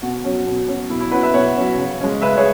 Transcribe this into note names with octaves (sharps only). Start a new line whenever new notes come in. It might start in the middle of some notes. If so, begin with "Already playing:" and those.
B2 F#4
F#3 C#4
B2
F#3 C#4
B2 E4
E4
F#3 C#4 F#4 B4
B4 E5
B2 C#5 F#5
F#3 C#4
C#3
G#3 C#4
C#3 B4 E5
G#4 C#5